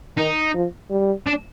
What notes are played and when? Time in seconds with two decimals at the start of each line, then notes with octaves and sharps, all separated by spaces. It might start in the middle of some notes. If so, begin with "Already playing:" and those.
0.18 D#3 D#4
0.54 F3
0.90 G3
1.26 D4